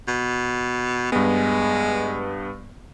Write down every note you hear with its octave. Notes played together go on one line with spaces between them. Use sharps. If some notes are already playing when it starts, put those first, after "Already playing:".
B2
G2 G#3 B3